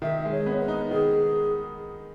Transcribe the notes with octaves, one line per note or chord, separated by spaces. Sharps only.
D#3 E5
G#3
C#5
B3
B4
D#4
D#3 G#4